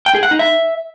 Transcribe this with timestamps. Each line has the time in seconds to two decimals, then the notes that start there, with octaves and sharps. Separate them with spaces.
0.06 G5
0.15 G#4
0.23 F#5
0.31 D#4
0.39 E5